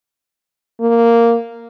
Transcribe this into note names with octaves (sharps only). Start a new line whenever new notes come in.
A#3